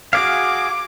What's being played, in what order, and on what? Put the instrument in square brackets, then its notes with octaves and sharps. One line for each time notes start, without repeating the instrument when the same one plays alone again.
[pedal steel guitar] F#4 G#4 F5 [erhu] D6